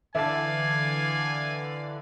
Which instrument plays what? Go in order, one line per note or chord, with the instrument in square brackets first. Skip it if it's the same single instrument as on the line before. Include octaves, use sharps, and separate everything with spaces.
[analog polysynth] D3 E3 [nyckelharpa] D5 F5 [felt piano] E5 A5 [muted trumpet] G#5